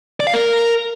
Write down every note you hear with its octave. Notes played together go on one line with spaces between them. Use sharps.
D5
F5
A#4